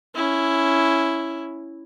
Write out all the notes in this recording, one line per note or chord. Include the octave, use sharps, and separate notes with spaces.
C#4 E4